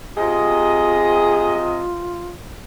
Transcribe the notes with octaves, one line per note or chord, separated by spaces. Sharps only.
C3 F4 G#4 D#5